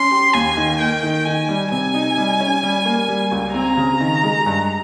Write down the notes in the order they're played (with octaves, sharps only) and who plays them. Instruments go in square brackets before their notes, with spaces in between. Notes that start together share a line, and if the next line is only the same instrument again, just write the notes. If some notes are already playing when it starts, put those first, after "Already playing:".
Already playing: [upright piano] C#4 [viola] C6
[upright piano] G4
[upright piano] D#2 [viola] G#5
[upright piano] D#3
[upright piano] A#3 [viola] G5
[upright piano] D#3
[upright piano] D#3 [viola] G#5
[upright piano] G3
[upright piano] C3 [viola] G#5
[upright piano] D#4
G3
C#4
G3
A#3
G3
C#2
[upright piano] C4 [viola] A#5
[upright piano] C#3
D#3
G#3
G2